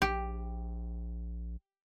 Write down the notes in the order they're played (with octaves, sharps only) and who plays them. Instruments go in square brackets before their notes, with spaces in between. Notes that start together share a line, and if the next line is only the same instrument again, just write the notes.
[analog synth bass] A#1 [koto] G4